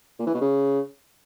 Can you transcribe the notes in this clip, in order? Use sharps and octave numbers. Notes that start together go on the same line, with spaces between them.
A#2
E3
B2
C#3